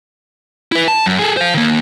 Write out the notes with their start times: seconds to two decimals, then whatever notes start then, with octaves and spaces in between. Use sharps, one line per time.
0.72 E4 B4
0.88 A5
1.06 F#2
1.19 G#4 A4
1.37 C5 F5
1.55 D#3 A#3